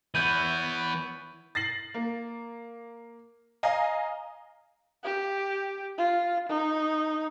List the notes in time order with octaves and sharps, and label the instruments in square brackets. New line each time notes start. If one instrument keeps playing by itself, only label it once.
[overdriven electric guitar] E3 B3 [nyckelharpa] E4 C#5 [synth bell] G6 D#7
[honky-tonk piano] A6 A#6 C7 F#7
A#3
D#5 F5 G#5 A#5
[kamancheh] G4
F4
D#4